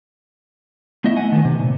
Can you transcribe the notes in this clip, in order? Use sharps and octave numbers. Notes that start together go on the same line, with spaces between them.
A3 B3 E4 D#5 E5
F#5 G#5
D#3 A3 B3
C3
A#2